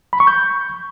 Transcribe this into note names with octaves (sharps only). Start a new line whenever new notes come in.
B5
C#6
G6